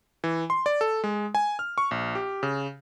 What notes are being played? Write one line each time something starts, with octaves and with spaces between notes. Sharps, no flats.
E3
C6
D5
A4
G#3
G#5
F6
C#6
A#1
G4
C#3